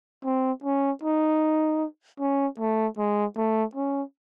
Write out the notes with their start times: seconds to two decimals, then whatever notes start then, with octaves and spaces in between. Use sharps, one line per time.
0.24 C4
0.64 C#4
1.03 D#4
2.20 C#4
2.59 A3
2.98 G#3
3.36 A3
3.75 C#4